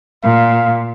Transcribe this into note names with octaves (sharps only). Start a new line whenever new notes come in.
A#2 F5